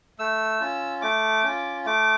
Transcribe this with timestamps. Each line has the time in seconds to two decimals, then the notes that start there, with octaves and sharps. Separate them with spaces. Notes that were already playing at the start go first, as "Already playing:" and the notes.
0.19 A3 E6
0.61 C#4 F4
1.02 A3 D6
1.44 C#4 F4
1.85 A3 D6